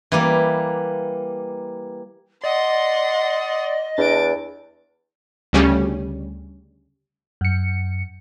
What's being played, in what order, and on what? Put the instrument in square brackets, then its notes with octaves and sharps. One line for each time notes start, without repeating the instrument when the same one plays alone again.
[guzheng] E3 G3 A#3
[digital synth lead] D5 [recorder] D#5 [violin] F#5 C6
[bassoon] E2 [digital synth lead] D4 [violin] A6 D7
[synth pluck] D2 C#3 G3 C#4
[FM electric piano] F#2 C#7